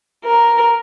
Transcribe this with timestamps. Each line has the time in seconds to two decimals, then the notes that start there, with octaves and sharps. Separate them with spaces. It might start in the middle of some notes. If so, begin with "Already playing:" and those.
0.24 A#4